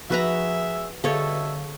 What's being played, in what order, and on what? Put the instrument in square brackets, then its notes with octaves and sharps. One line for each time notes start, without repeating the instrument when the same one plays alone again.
[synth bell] F3 [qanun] F#4 B4 A#5 [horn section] G#4 E5
[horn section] G2 B2 E5 [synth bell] D3 G#4 F5 [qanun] A4 C#5